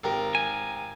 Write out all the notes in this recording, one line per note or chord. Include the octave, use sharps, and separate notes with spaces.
G#1 G4 A#4
G#5